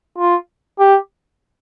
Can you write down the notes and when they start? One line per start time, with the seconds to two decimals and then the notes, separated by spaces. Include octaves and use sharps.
0.18 F4
0.79 G4